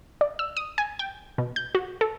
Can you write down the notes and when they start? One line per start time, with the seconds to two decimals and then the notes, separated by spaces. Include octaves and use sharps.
0.21 D5
0.39 E6
0.57 D#6
0.78 G#5
0.99 G5
1.38 B2
1.56 G6
1.75 F#4
2.01 A4